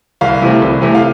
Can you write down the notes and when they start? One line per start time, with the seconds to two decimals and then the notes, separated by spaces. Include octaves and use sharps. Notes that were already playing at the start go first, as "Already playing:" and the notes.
0.21 C2 F5
0.42 C3 E3 A3 C4
0.62 C2
0.81 C3 E3 A3 C4
0.95 F5